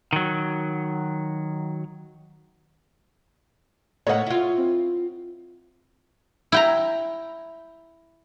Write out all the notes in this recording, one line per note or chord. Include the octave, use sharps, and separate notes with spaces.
D#3 F#3
A2 A#3 C#5 D#5 F#5
E4 F4
C4
E4 G5 A#5